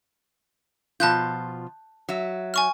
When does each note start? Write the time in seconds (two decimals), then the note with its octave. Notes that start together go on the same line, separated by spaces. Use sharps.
1.00 B2 F3 F4 A5 F#6 G6
2.09 F#3 E5
2.54 G#5 C#6 F6